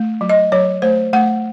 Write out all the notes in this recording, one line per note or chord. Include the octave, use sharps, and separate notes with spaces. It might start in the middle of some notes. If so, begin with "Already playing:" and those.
Already playing: A3
F#3
D#5
F#3 C#5
A3 C5
A3 F#5